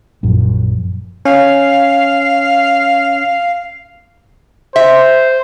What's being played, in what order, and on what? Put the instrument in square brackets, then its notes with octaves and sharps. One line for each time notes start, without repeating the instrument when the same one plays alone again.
[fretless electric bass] A#1 F#2
[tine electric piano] C#4 [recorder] F5
[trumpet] C5 [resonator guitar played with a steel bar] E5